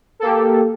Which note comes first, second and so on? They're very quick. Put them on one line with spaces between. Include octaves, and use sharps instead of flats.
A4 A#3 G4